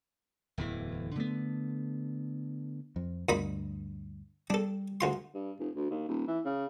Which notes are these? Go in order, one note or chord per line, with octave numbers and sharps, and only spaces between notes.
D1 E2 E3
D3 A3 B3
F2
D2 G2 A#2 D#4 B5
G3 D4 A4
D2 F4 C6
G2
F1
D2
D#2
D#1
E3
C#3